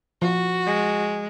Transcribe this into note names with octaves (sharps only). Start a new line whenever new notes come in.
F3 F#4
G#3